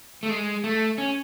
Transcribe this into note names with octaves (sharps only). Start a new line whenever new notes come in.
A3
G#3
A3
C#4